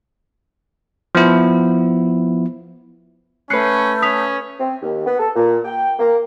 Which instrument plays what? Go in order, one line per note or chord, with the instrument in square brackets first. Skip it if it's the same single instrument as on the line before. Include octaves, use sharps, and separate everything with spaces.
[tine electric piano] F3 B3 E4
[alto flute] A3 [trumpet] C#4 [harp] B4 F#6 [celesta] C7 C#7
[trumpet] C#4 [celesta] D#6 B6 F7
[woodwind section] C4
D#2
B3
A4
A#2
G5
A#3